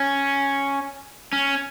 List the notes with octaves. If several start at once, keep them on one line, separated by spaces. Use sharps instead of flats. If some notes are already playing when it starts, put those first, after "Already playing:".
Already playing: C#4
C#4